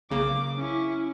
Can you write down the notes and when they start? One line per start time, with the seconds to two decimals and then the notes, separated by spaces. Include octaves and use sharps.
0.11 B1 C#3 A#3 D6
0.57 C#4 E4